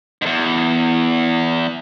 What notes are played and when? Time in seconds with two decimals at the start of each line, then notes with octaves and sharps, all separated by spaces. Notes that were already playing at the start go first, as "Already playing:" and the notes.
0.22 E2 G#2